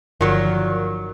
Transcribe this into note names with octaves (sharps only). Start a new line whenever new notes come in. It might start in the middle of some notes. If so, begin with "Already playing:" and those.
G1 A#2 D#3 F3 F#3